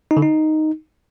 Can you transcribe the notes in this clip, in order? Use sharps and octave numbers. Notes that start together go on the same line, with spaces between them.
D#4
D3
D#4